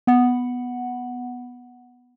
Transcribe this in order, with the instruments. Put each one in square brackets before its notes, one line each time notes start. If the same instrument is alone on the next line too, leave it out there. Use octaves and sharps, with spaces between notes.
[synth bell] B3 F#5